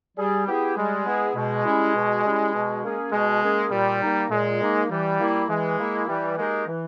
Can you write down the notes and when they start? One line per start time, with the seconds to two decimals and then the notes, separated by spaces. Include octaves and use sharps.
0.17 G3 G#4
0.47 B3 E4 G4 G#4
0.77 G3 G#3
1.06 B3 E4 G#4
1.36 B2 G#3
1.65 G3 C#4 E4
1.95 B2
2.25 G3 C#4 E4
2.54 B2
2.83 A#3 C#4 G#4
3.12 B2 G#3
3.42 A#3 C#4 G#4
3.71 A#2 G3
4.01 A#3 D#4
4.31 A#2 G#3
4.61 A#3 D#4
4.90 E3 G3
5.20 A#3 E4
5.49 E3 G#3
5.78 A#3 E4
6.08 E3 G3
6.38 G#3 A#3 D#4 G4 A#4
6.67 E3